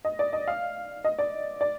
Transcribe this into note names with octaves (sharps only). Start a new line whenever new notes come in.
D#5
D5
D#5
F5
D#5
D5
D5